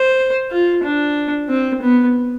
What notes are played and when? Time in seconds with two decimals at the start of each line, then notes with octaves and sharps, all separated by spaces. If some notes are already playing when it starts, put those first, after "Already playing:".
Already playing: C5
0.51 F4
0.84 D4
1.49 C4
1.82 B3